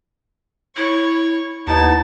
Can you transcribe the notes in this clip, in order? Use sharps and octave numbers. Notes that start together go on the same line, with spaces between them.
E4 C#5 C#6
D#2 B3 D#4 E4 A5